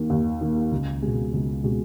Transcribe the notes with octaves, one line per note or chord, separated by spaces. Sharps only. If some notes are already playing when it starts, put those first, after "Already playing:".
Already playing: D#2 D#3 A#3
D#2
D#3 A#3
C#2
B2 G#3
C#2
B2 G#3